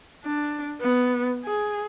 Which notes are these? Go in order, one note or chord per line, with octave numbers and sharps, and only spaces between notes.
D4
B3
G#4